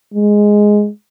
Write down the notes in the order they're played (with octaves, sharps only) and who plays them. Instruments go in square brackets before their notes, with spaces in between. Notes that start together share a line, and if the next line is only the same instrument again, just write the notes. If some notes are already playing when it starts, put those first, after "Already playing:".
[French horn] G#3